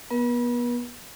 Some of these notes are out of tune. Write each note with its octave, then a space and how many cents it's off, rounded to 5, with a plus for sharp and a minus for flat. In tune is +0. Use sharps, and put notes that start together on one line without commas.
B3 -30 B4 -45